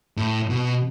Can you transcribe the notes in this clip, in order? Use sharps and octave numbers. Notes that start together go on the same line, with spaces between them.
A2
B2